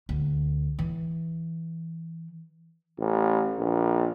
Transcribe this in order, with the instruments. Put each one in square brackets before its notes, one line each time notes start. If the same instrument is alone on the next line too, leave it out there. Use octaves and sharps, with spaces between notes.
[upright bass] D2
E3
[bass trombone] A1
A#1